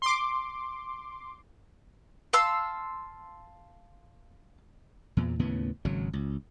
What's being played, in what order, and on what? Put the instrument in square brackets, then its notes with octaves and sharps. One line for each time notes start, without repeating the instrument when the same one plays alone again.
[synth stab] C6 D6
[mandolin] F5 A5 C6 E6
[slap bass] E2 A#2
D#2 A2 C#3 B3
G#1 C#3 F#3
C#2